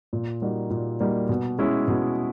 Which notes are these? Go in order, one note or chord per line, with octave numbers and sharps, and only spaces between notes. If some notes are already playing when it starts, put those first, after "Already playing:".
A#2
G3 A#3 D#4 F#4
A#2
G3 A#3 D#4 F#4
B2
G#3 C#4 E4
B2